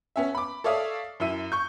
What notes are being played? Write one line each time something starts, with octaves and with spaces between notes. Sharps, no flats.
B3 C#4 E5
B5 D6
A4 C#5 D5 E5 F5 D#6
F#2 E4 E5 E6 D#7
C#6 G6